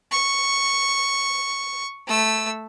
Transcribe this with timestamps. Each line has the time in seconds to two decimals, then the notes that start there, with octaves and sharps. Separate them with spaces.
0.11 C#6
2.07 A3 E6